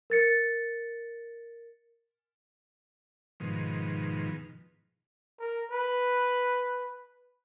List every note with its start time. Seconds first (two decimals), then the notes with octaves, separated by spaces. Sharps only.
0.10 A#4 A6 C#7
3.40 G#2 B2 D#3 F3
5.39 A#4
5.71 B4